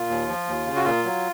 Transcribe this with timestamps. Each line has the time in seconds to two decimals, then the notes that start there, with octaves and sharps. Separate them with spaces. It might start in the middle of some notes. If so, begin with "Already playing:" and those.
Already playing: A#2 F4
0.10 D#2
0.28 F3
0.48 D#2
0.66 C#3
0.76 F#4
0.85 A#2 F4
1.04 F#3